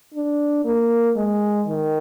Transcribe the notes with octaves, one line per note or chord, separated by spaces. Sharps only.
D4
A#3
G#3
D#3